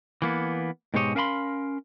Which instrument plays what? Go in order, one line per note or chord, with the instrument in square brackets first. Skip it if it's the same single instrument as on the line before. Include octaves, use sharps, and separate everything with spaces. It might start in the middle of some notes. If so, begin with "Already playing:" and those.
[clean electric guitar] E3 A#3 B3
G#2 B2 G#3 G4 C#5 D#5
C#4 A#4 F5 G#5 B5 C6